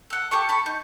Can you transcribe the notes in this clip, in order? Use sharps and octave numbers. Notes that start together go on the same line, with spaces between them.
A4 F#5
G4 A4 A5 C#6
A5 B5 C#6
D#4